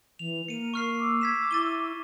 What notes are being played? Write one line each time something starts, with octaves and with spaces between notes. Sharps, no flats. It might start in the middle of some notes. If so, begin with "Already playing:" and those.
E3 F7
A#3 A#4 C#7 D#7
C#6 F6 C7
D6 E6
G#6 B6 E7
E4 A6 D#7 G7